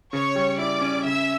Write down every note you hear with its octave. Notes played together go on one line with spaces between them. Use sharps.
C#3 C#5 C#6
G3
E4 D5 D6
C#4
C#3 E5 E6